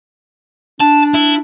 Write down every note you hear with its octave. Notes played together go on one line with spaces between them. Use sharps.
D4 A5
E4